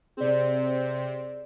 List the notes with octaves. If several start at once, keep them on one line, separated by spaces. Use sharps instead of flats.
C3 C4 G#4 D5